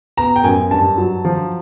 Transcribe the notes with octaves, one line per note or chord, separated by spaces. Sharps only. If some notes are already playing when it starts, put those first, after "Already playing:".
B3 A#5
G5
F#2 G#5
G2 A5
F#3
F3